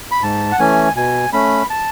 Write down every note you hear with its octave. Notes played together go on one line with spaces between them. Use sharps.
B5
G#2 A5
F#5
E3 A3 C#4 G#5
B2 G#5
A3 C#4 B5
A5